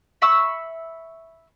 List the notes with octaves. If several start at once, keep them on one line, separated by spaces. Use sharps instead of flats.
E5 B5 C#6 E6